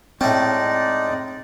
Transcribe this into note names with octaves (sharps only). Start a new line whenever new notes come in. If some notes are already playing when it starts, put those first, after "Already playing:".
A2 G#3 C4 C#4 D#4 D5 G5 A5